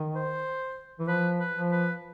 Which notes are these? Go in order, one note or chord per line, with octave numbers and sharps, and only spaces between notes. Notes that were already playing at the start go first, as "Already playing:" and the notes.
Already playing: D#3
C5
E3
F3 B4
B4
F3
B4